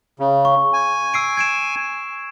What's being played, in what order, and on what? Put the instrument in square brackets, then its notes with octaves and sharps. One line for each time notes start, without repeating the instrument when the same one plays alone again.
[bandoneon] C#3
[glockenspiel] C#6
[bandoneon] G#5
[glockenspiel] E6 C7 D7
G#6 D7 E7